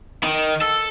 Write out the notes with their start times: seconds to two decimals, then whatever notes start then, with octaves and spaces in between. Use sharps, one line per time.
0.24 D#3
0.62 A4